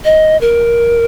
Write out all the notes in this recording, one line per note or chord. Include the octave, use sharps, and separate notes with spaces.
D#5
A#4